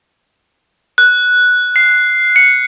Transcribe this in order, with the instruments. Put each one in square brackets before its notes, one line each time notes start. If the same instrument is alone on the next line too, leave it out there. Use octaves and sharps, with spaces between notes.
[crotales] F#6
C7
C#7